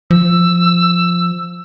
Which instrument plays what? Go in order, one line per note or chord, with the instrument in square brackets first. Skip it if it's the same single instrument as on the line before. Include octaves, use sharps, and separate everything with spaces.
[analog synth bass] F3 [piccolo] E6